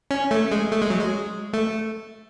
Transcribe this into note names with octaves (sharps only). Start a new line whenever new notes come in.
C#4
A3
G#3
A3
G#3
F#3
G#3
A3